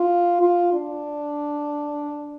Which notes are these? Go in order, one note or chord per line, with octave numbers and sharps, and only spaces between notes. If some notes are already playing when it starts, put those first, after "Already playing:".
Already playing: F4
F4
D4